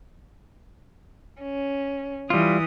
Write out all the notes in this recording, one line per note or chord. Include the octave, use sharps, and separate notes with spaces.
C#4
E3 G3 F4 D#6